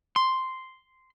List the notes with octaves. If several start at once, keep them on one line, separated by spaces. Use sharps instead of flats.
C6